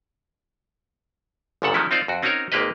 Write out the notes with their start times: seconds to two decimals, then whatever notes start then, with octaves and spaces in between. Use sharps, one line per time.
1.62 G1 F#2 A#2 C#3 A4 F#5
1.74 D#3 F3 F#3 G#3 C#4 E4
1.91 C4 D#4 F4 C5 D5
2.08 F2 F#4
2.22 C4 C#4 D#4 F#4 A#4 C#5
2.52 G#1 G#3 A#3 G4 B4 D#5